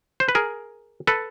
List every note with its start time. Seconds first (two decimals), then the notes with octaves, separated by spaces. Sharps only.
0.20 C5
0.29 B4
0.35 G#4 A#4
1.07 A4 B4